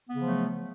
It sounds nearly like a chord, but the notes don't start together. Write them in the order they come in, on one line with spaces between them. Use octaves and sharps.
B3 C#3 F3 F#3 A3